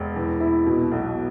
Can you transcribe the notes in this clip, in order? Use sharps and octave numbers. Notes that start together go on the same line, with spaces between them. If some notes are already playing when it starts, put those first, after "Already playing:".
Already playing: E1
E3
E4
B2
B1